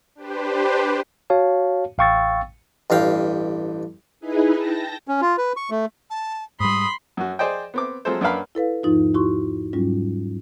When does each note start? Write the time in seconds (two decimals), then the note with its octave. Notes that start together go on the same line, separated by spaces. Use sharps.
0.15 D4 G4 B4 C5
1.30 F#4 C#5 F5 A5
1.98 A1 F5 G5 C#6 E6 A6
2.90 A1 G2 F5 G5
4.20 D#4 E4 G#4 B4
4.56 G5 A5 A#6
5.08 C#4
5.21 F4
5.38 B4
5.57 C#6
5.70 A3
6.10 A5
6.60 G#2 G3 B5 C6 D#6
7.17 F#2 F#4
7.39 G#4 C5 D5 D#5 G5
7.74 B3 C4 D6
8.05 F3 F#3 G#3 C4 A4 C5
8.21 F#2 D4 A#4 B4 F5 B5
8.55 E4 A4 B4 F5
8.83 E2 G#2 F3 D#4 F4
9.14 E4 F#4 C6 C#6
9.73 G#2 F#3 G3 C#4 F4